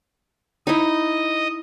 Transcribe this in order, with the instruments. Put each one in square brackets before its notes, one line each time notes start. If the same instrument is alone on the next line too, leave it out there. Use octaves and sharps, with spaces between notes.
[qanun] D#4 E4 [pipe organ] D#5